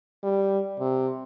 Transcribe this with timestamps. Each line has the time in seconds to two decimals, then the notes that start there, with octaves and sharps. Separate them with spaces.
0.23 G3
0.79 C3